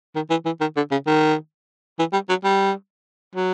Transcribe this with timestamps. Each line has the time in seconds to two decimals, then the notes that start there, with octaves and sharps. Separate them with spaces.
0.15 D#3
0.30 E3
0.45 E3
0.61 D#3
0.76 D3
0.91 C#3
1.07 D#3
1.99 E3
2.13 G3
2.29 F#3
2.44 G3
3.35 F#3